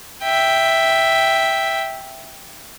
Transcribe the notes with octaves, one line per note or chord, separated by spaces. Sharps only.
E5 G5